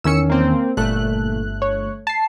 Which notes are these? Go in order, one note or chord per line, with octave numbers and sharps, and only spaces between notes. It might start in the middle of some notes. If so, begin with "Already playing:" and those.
E2 D#3 C#4 E6 C#7
A#3 C4
G1 A#2 A3 F#6
C#5
A5 C7